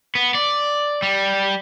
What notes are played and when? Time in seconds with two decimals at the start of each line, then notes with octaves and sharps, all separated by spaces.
0.15 B3
0.35 D5
1.02 G3